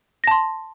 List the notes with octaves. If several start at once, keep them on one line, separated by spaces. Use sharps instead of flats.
A5 C6 A#6